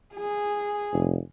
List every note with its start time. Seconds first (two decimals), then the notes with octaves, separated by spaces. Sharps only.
0.15 G#4
0.93 F1